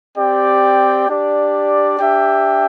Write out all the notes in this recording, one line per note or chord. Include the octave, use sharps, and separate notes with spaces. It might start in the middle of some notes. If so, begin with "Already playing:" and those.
C4 G4 D5 G5
D4 G4 D5
D4 G4 E5 G5